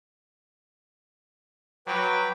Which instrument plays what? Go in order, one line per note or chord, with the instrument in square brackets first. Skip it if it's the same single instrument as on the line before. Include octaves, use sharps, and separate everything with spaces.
[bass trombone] F#3 [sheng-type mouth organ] B4 G5 D6